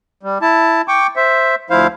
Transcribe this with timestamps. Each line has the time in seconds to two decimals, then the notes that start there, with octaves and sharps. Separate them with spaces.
0.23 G3
0.42 E4 A5
0.88 G5 C#6 D6
1.16 C5 E5
1.70 D2 F3 E4 C5 F5